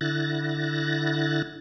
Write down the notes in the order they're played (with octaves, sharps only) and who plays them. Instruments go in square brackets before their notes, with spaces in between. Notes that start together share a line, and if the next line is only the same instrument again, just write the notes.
[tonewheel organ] D3 E4 F#6 A6 A#6